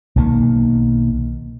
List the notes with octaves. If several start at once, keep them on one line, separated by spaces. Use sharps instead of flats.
B1 D#3 A#3